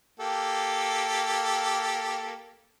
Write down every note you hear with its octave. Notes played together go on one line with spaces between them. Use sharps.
A#3 G4 A4